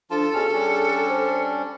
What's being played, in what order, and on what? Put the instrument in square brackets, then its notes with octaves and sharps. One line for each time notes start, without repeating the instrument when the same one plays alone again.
[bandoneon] F3 F4 A5 [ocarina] D4 [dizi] A4
[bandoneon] B2 C#4 F6 [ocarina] G#4
[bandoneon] G3 C#4 D4
[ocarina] C5